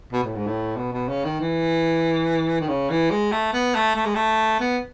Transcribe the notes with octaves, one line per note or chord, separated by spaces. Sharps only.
B2
A2
G#2
A2
B2
B2
C#3
D#3
E3
D#3
C#3
E3
G#3
A3
B3
A3
A3
G#3
A3
B3